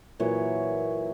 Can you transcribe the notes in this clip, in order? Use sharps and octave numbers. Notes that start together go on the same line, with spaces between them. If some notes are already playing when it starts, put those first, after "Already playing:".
A#2 E3 F#3 C#5